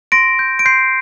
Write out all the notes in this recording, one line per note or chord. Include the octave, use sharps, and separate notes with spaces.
C6 A#6 D7
G6
D7
C6 G6 C7